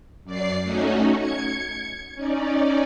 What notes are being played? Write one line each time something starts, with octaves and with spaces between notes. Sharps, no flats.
F#2 D5 C7
A3 C#4 D#4 F#4
G#6 C#7
C#4 D#4 D5